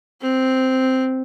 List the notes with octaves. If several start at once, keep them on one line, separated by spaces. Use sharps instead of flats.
C4